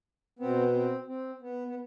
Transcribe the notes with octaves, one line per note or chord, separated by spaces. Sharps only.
B2 B3 C4
C4
C4
B3
B3